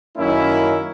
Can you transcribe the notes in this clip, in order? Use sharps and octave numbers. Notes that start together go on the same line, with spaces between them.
F#2 D#3 A#3 C#4 E4